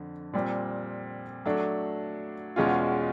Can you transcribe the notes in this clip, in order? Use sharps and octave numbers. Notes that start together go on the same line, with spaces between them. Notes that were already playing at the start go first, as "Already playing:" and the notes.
Already playing: F2 D3
A#2 G3 C4
F#3 A3 D4
E2 B2 G#3 C#4 F4